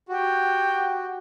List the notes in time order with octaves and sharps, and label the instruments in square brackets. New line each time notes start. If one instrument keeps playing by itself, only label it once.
[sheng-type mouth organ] F#4 [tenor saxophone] G4